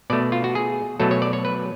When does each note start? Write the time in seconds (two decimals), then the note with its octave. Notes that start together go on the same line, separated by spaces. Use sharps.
0.10 B2 A3 D5
0.32 F4
0.44 F#4
0.55 G#4
1.00 B2 F#3 A3 A4
1.11 C#5
1.22 D5
1.33 C#5
1.45 B4